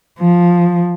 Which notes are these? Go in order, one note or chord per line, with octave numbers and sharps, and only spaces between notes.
F3